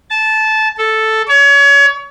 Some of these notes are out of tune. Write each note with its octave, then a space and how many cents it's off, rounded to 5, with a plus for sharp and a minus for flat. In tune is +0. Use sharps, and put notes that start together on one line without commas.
A5 -15
A4 +0
C#5 +30